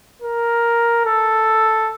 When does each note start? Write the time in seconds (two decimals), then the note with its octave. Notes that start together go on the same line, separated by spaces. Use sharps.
0.22 A#4
1.06 A4